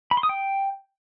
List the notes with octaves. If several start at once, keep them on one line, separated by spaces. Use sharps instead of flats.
B5
C6
D#6
G5